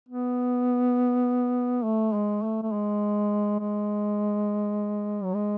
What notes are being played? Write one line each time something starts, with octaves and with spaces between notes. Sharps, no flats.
B3
A3
G#3
A3
A3
G#3
G#3
F#3
G#3